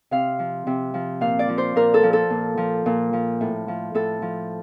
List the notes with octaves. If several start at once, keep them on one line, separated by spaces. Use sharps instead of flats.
C3 F5
F3
C3
F3
A#2 F5
D5
F3
C5
A#2 A#4
A4
F3
A4
A#2
F3
A#2
F3
A2
F3
A2 A4
F3